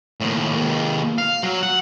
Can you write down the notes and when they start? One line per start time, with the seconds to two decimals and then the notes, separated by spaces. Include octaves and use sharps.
0.21 D#2 A2
0.48 D#2 G#3
1.18 F5
1.43 F#3
1.63 F#5